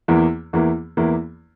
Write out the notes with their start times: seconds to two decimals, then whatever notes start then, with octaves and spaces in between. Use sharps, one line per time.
0.08 E2 E3 A#3 E4
0.53 E2 E3 A#3 E4
0.97 E2 E3 A#3 E4